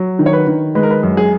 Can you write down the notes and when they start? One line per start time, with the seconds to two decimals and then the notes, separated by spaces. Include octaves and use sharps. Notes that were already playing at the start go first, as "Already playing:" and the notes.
Already playing: F#3
0.19 D#3
0.26 C#5
0.33 B4
0.47 D#3
0.75 G#3 B4
0.83 A#4
0.91 B4
1.03 F#2
1.17 G#4